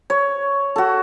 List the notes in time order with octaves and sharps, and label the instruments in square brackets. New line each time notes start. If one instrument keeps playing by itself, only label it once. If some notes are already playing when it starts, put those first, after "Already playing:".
[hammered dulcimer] C#5
F#4 A4